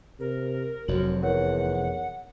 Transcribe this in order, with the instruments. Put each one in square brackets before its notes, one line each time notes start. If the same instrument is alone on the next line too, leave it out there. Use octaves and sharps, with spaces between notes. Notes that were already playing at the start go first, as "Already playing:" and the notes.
[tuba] C3 [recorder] A#4
[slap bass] F1 F2 [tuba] F#3 [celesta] F#4 F#7
[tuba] E2 [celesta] A#4 C#5 [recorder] F#5